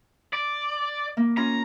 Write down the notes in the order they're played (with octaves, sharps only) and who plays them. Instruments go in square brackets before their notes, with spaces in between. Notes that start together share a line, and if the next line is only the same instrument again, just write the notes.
[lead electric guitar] D5
[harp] A#3
[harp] C#4 F4 [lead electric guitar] A#5